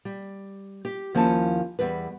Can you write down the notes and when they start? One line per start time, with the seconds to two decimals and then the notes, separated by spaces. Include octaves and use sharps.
0.05 G3
0.85 G4
1.15 D#2 F3 C#4 E4 A5
1.79 E2 G3 B4